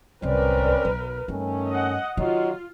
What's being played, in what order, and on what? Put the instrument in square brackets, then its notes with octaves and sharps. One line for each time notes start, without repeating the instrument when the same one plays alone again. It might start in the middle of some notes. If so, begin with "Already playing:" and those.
[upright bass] D1 C2 [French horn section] C4 C#4 D5 [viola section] A#4 B4
[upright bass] B1
[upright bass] G2 [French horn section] D#3 A3 C#4
[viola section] D#5 F#5
[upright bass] D#3 D#4 [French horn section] F#3 D#5 [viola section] F4